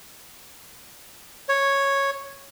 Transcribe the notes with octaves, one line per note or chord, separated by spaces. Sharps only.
C#5